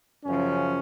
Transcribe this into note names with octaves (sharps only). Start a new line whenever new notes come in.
F#2 C#3 F3 C#4